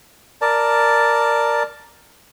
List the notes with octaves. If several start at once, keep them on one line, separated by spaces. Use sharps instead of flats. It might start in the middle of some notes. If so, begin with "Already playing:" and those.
A#4 D5 A5